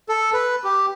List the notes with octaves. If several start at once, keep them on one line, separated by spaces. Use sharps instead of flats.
A4
B4
G4